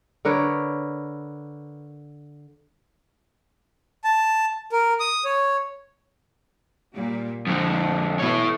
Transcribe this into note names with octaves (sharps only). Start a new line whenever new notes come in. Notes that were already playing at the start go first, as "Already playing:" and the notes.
D3 A#4 B4 C#5
A5
A#4
D#6
C#5
A#2 G3
F2 D3 F3 A3
B2 E3 A4 C#5